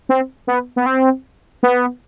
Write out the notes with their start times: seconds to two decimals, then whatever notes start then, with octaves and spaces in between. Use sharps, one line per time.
0.09 C4
0.47 B3
0.76 B3
0.86 C4
1.63 B3